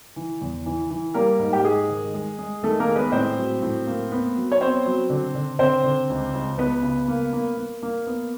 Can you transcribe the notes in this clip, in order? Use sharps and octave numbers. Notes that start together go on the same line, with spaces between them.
E3
E2
E3
E3
G3 A#3 A#4
G#2
G4
G#2 G#3 G#4
D#3
G#3
G#3
D#3 A3 A4
A#3 A#4
G#3
B3 B4
A2 C4 C5
F#3
A2
A#3
B3
F#3
C#5
B3 C4 C5
F#3
D3
D3
D3 C4 C5
D3
C#2
C#2
C#2 B3 B4
C#3
A#3
A#3
A#3
A#3
B3